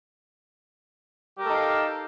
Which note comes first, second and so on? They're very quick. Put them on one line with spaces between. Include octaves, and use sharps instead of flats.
G4 A#4 A4 D#4 F5